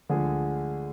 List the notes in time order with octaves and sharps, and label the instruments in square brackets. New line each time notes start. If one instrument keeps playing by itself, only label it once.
[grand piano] D2 D3 F3 G#3 G#4